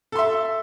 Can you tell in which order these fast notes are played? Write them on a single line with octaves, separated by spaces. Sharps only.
A4 C6 E5